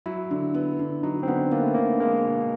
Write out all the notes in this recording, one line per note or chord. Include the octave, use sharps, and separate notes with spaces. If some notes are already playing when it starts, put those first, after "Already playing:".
F#3 E4
D3
B3
D3
F#3 D#4
C4
D3 B3
A#3 B3
A3
D3 A#3
G#3 A#3
B2